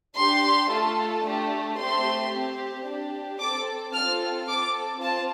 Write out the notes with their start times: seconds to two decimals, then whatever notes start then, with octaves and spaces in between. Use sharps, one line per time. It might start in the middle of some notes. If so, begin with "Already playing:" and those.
0.18 D4 G4 C6
0.71 A3 F4 A4
1.25 A3 D4 G4
1.79 A3 C4 G4 C6
2.33 C4 G4
2.87 D4 G4
3.40 C4 A4 D6
3.94 C4 F4 A4 F6
4.49 C4 A4 D6
5.02 C4 F4 A5